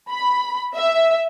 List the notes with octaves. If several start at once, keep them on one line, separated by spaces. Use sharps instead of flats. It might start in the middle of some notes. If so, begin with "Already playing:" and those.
B5
E5